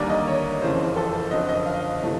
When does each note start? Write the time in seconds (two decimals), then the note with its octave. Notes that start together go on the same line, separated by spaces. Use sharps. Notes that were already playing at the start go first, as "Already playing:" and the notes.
Already playing: D#2 D3 G3 A#3 D5
0.09 D#5
0.27 C#5
0.62 F#1 F2 C#3 E3 C5
0.96 A4
1.31 F#1 F2 D3 F#3 D#5
1.49 D#5
1.66 F5
2.02 C3 E3 A3